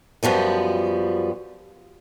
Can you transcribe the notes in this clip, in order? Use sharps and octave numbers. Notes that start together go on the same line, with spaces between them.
F#2 F3 G3 B3